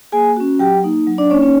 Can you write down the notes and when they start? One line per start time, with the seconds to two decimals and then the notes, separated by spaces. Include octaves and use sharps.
0.12 A#3 G#4 G#5
0.37 C#4 F#4
0.59 F#3 G4 G5
0.84 A#3 D#4
1.07 F#3
1.18 D4 D5
1.30 A#3 C#4 C#5
1.35 D#4
1.42 C#4 C#5